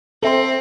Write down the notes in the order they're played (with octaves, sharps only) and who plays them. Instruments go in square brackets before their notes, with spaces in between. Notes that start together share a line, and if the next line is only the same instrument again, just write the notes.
[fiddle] C4 [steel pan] A4 C5 E5 A5 C6